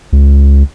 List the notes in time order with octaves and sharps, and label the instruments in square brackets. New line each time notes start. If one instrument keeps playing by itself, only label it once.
[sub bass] C#2